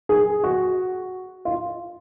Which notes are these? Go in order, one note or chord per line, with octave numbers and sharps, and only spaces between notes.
G#4
F#4
F4